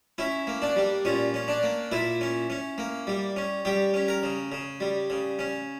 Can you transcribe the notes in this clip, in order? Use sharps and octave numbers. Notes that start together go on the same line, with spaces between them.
C#4 E4
A#3
D4
G3
A#2 C#4
C#4
D4
A#3
A#2 E4
C#4
C#4
A#3
G3
C#4
G3 G4
C#4
A#4
C#3
C#3
G3
C#3
C#4